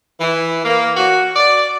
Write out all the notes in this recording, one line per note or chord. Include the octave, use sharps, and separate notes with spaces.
E3
A#3
F#4
D5